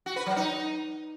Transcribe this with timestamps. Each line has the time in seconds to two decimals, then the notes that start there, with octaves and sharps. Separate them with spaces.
0.06 F#4
0.16 B4
0.26 F#3
0.36 D#4